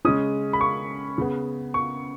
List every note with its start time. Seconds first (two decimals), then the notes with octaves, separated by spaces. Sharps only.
0.05 C#3 G#3 C#4 D#6
0.53 B5
0.61 C#6
1.18 C#3 B3
1.74 C#6